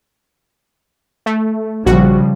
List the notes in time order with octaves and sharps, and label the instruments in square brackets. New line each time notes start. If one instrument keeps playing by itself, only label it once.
[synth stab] A3
[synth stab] A#1 F#4 [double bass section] C#3 F3 G3